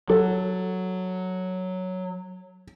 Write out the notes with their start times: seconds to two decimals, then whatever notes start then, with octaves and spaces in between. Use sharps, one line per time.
0.10 F#3 A4